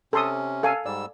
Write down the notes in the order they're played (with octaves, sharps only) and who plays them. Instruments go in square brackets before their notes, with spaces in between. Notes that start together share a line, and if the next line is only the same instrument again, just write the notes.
[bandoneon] C3 C#4 [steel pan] A4 C6 D#6
[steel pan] A4 F5 G#5
[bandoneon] G#2 G3 E6 [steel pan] D5